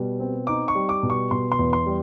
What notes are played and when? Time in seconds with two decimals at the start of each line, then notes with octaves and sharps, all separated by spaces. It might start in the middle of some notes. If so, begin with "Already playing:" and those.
Already playing: B2 G3
0.20 C4
0.47 D#4 D6
0.68 C#6
0.75 G3
0.89 D6
1.03 B2
1.10 C#6
1.31 B2 C6
1.52 C6
1.59 E2
1.73 C6
1.86 G3